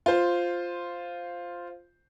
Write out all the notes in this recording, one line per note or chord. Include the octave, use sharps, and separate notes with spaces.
F4 C5